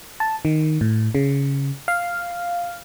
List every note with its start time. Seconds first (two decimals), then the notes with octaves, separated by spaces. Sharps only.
0.20 A5
0.45 D#3
0.81 A2
1.15 C#3
1.88 F5